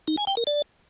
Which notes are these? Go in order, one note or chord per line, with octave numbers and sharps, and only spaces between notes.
D#4
G#5
G5
A#4
D5